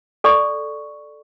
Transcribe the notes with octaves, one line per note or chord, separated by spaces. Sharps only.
A4 D5 C#6